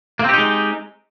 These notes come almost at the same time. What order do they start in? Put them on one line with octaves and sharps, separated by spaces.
A#3 C4 G4 D#4 G#3